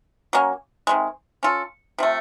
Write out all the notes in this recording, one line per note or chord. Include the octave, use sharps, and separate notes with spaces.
F#3 A#3 C#4
C3 D#3 G#3
C#4 F4 A4
C3 F3 A3